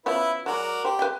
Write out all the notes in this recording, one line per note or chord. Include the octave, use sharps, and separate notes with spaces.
F3 B3 C#4 E4 B4
F#3 G#3 F#4 A#4 D5
G4 C5
B4 E5 G5